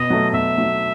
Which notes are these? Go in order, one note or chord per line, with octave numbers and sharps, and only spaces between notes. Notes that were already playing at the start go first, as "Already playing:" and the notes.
Already playing: B2 D#5
F#3 A3
B2 E5
F#3 A3